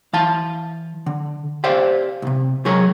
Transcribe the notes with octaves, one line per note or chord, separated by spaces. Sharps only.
E3 F5 A5
D3
G4 C5 D5 E5 F5
C2 C3
F#3 G#3 G#4 A#4 C#5